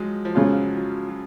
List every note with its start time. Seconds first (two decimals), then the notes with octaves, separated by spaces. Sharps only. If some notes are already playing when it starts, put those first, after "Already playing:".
Already playing: F3 F#3 G#3
0.25 F3
0.35 C#3 F#3 G#3 C#4 F4
0.77 F#3
1.09 F#3